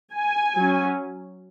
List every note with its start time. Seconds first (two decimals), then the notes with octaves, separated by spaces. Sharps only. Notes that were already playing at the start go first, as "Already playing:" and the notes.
0.13 G#5
0.56 F#3 C#4